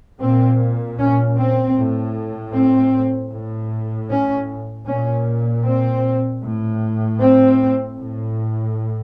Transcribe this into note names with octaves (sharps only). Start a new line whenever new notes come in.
A#2 C4
C#4
C4
A2
C4
A2
C#4
A#2 C#4
C4
A2
C4
A2